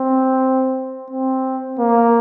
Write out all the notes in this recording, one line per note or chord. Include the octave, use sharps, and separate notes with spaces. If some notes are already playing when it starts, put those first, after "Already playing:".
Already playing: C4
C4
A#3